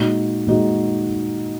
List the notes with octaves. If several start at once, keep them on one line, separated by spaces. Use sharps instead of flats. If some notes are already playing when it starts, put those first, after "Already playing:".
Already playing: A#2 G#3 D#4 F#4
A#2 G#3 D#4 F#4